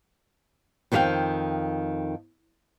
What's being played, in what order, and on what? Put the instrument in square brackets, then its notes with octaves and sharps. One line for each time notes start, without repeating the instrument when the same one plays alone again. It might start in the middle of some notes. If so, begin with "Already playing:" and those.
[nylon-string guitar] F2 D#3 D4 G4 F5 G5